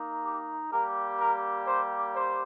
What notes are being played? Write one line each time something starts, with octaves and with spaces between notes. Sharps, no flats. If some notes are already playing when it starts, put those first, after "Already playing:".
Already playing: A#3 D#4
G4
G3 A#3 G4 A#4
A#4
C5
C5